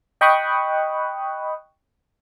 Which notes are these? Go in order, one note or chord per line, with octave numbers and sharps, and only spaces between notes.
D#5 G5 B5 C#6 D#6 F#6